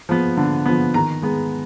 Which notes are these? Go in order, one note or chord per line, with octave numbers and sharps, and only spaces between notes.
F3 B3
D3
F3 B3
D#3 A#5
G#3 B3